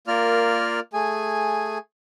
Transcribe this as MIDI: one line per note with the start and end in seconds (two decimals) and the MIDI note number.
0.07 0.80 58
0.07 0.80 65
0.07 0.80 70
0.07 0.80 74
0.07 0.80 89
0.93 1.78 57
0.93 1.78 68
0.93 1.78 80